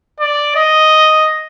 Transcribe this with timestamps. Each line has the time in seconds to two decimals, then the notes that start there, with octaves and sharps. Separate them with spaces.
0.20 D5
0.56 D#5